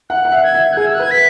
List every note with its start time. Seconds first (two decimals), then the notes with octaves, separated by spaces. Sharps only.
0.10 F#5 F#6
0.25 F#5
0.32 E5
0.43 G#6
0.55 E5
0.73 F#6
0.77 G#4 G#6
0.86 E6
0.94 F#6
0.99 B4
1.02 G#6
1.11 B6